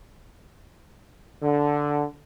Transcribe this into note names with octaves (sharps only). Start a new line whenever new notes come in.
D3